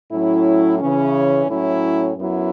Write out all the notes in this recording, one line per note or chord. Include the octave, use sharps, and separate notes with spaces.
A2 F#3 C#4 E4
C#3 E3 C#4
A2 F#3 C#4 E4
F#2 F#3 B3 E4